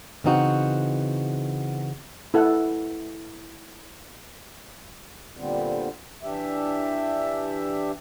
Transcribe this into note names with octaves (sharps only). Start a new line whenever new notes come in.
C#3 E3 C4 D#4 F#4 F#5
E4 A4 F#5
A#2 D3 G3 B3 C4
E3 D4 G4 E5